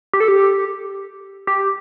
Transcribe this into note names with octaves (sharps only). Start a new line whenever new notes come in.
G4
A4
G4
G4